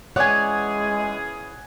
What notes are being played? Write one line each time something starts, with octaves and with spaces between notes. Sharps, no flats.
E3 G#3 C#4 G#4 C#5 D5 F#5 G#5